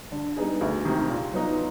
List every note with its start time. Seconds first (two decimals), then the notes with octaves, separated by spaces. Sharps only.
0.12 D3
0.37 G3 B3 D#4 G#4
0.61 D2
0.85 C3 D#3 G#3
1.10 A#2
1.33 F#3 B3 D#4